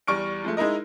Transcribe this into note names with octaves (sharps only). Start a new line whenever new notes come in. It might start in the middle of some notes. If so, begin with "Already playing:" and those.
E2 G3 C#6 F6 D7
F3 G#3 A3
G#3 D#4 E4 A#4 D#5